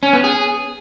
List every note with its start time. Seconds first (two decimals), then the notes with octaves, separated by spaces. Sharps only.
0.03 C#4
0.13 B3
0.24 G#4